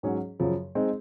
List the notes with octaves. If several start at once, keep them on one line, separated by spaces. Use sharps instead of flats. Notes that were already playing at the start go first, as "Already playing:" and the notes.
G#2 F#3 C#4 G#4 C#5
F#2 C#3 F3
G#3 C4 D#4